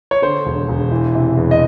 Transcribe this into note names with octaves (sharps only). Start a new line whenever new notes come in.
C#5
D3 C5
E1
E1
E3
C3
E2
D#5